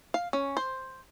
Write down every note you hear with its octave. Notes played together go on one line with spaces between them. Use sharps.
F5
C#4
C5